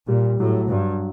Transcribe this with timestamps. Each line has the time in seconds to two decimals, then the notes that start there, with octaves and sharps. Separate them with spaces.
0.08 A#2 G3
0.39 A2 F#3
0.70 G2 F#3